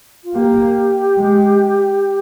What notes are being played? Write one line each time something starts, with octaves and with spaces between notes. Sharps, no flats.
F4
A#3 G4
G#3